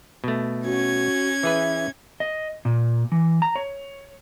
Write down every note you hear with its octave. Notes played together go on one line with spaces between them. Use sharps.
B2 A3
C#4 F#4 G#6
E3 G#4 B4 E5
D#5
A#2
E3
A#5
C#5